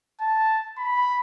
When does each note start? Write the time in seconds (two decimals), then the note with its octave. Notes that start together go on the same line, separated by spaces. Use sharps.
0.20 A5
0.78 B5